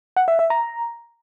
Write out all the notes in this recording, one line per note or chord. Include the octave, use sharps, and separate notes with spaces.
F#5
E5
E5
A#5